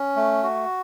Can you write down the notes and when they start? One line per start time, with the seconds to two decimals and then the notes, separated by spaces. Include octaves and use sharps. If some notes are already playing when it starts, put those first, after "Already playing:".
Already playing: C#4
0.16 A3
0.43 F#4